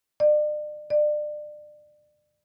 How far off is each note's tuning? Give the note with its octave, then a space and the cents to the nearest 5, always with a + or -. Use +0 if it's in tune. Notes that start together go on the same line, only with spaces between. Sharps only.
D5 +40
D5 +30